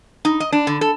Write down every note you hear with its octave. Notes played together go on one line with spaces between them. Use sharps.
D#4
D#5
D4
D3
A4